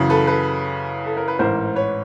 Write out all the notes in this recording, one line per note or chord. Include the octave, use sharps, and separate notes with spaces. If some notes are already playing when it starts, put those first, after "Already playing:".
Already playing: F#2 C#3 E3
A4 B4
A4 B4
A4
A#4
B4
A1 G#2 E3 A#4 C5
B4 C#5